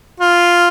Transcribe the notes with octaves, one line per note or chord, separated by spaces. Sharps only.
F4